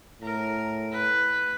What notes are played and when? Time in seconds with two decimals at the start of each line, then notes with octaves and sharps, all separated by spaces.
0.22 A2 A#4
0.92 B4